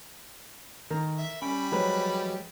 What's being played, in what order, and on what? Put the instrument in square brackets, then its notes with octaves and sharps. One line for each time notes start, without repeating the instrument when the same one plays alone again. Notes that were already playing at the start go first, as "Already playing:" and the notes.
[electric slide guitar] D#3 [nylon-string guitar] A#4
[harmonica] E5
[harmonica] G3 B5 [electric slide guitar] C#4 G5
[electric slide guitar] F3 [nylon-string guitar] F#3 G#3 B4